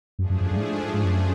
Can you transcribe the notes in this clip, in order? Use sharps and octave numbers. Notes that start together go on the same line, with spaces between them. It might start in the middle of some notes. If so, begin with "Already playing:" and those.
F#2 F3 A3 D4 G#4
F#2
F#2
F#2
G#2
A2
G#2
G#2
G#2
F#2